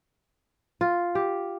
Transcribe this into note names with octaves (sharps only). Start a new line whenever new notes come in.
F4
G4